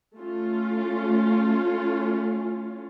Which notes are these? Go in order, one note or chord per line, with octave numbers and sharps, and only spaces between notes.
A3 C#4 F4